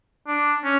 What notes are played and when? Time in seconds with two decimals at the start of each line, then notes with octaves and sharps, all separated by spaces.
0.28 D4
0.64 C#4